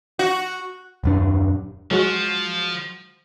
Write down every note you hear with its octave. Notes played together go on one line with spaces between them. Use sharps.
F#4
D#1 F#2 D4
F3 F#3 G#3 F#4